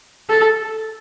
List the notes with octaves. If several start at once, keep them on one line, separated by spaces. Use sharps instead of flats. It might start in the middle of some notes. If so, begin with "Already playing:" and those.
A4